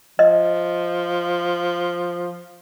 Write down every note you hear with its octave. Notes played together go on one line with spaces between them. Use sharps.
F3 D#5